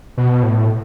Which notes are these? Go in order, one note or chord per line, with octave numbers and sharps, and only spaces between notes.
B2
A2